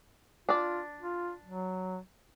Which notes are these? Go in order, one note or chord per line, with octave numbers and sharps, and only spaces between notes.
D4 F4 D5
F4
F#3